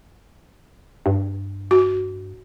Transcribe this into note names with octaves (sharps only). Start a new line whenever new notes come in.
G2
F#4